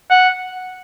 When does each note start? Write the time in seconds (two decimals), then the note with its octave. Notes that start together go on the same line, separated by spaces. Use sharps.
0.10 F#5